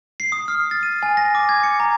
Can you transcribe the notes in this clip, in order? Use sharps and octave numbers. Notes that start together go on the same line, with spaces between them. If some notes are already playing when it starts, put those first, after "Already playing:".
C7
D#6
F6
A6
D#7
G#5
A#6
D6
G#6
C#7
A#5